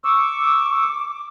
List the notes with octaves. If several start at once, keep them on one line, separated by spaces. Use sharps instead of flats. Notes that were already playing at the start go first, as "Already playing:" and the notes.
C#6 D6 E6